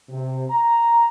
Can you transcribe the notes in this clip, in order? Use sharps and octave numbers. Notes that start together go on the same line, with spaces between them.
C3
A#5